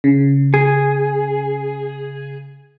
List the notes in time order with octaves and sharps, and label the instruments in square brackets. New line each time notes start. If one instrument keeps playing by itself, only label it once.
[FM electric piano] C#3
[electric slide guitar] G#4